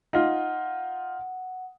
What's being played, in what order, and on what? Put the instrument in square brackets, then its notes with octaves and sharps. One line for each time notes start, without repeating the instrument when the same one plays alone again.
[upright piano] D#4 F4 [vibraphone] F#5